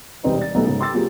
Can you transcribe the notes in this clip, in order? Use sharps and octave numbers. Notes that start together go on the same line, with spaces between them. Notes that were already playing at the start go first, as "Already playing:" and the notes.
E1 C3 G3 C4 D#4 B4
D5 A6
B1 A3 B3 D#4 A#5
G#2 C#3
G5 C6 D6 E6 A6
F#3 A#3 C4 F4 G4 G#4